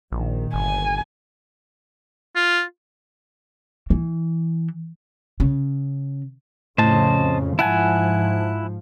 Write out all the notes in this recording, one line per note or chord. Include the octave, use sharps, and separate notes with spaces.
A#1 A#2 D#3
G1 G#5
F4
E3
C#3
F2 A2 C#3 C5 D#5 A5
G#2 F3 E4 F#5 G#5 A5